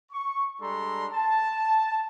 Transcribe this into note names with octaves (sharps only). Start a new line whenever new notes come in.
C#6
G3 G#3 D4 A4 A#5 C6
A5